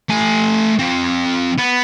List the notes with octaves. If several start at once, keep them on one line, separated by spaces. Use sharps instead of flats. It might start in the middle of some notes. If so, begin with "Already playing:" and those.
A3 G#5
F3 C4
B3